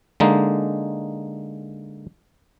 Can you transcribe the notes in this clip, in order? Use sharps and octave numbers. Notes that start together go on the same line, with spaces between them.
D3 G#3 A#3 D#4